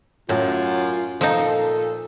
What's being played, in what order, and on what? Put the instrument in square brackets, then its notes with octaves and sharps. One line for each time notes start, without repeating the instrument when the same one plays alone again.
[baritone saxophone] F#2 [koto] A2 [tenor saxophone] F4
[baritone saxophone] A#2 [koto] F3 D#4 [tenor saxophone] A4